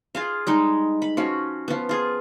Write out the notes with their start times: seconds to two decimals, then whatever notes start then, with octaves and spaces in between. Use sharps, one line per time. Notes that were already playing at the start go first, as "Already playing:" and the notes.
0.15 F4 G#4 F5
0.47 G3 G#3 D#4
1.02 B5
1.17 F3 C#4 F#4
1.68 F3 B3
1.89 F4 G#4